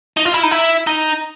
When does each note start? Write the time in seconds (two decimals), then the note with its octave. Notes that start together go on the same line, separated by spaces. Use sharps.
0.17 D#4
0.25 F4
0.34 E4
0.43 D#4
0.51 E4
0.87 D#4